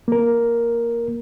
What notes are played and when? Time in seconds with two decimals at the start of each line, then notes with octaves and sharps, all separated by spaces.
0.08 A#3 A#4